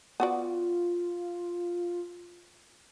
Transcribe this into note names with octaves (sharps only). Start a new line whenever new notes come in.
B3 F4 F#4 D5